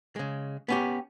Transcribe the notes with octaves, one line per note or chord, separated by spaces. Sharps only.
C#3 G#3
B3 C#4 G4